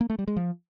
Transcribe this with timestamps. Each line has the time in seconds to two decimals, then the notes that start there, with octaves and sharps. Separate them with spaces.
0.01 A#3
0.10 A3
0.19 G3
0.28 G#3
0.36 F3